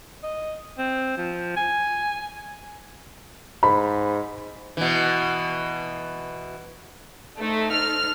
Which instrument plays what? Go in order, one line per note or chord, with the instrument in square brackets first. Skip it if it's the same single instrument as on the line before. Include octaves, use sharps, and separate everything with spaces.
[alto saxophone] D#5
C4
F3
G#5
[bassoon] G#2 [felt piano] B5
[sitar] B2 E3
[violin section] A3 [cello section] D#4 A4 C5
[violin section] F6